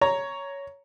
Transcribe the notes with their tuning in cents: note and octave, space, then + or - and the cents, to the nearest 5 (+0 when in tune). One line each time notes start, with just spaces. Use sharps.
C#5 +10 A#5 +0